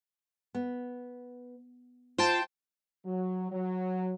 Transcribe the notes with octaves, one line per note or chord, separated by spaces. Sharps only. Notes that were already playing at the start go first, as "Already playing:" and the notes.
B3
F4 C5 G5 A5
F#3
F#3